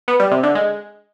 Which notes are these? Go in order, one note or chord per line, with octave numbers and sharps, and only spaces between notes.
B3
G3
C3
D3
G#3